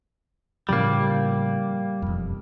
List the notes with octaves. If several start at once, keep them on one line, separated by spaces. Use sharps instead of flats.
A2 C#3 F3 G3 A#3
E1 F2